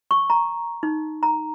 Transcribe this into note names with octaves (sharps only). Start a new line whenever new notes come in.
C#6
A#5
D#4
A#5